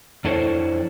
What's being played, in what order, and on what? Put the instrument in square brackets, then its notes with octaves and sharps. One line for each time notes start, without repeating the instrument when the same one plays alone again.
[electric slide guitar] F2 D4 E4 A4 C5 C#5